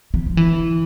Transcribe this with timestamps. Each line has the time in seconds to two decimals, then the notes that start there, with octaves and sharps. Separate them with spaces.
0.14 E3
0.26 F3
0.37 E3